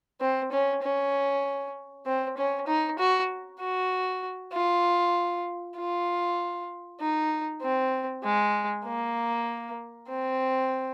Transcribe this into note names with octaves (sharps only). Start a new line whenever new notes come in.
C4
C#4
C#4
C4
C#4
D#4
F#4
F#4
F4
F4
D#4
C4
G#3
A#3
C4